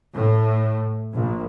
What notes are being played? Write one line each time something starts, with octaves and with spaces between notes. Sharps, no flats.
A2
A#1